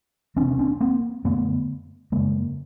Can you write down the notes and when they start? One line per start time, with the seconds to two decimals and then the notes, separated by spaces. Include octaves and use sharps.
0.36 E2 C4 D4
0.42 C3
0.48 C#4
0.59 C4 D4
0.81 A#3 C4
1.24 F#2 D3 A3 B3
2.12 F#2 C#3 G#3 A#3